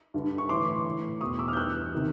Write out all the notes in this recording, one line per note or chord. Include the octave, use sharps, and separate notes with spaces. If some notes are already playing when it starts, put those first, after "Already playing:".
G2 D3
C#6
A2 E3 C6 D6
A2 E3
E2 B2 C#6 D#6
D6 E6
D#6 F6
G6
G2 E3 E6 F#6
C3 D#3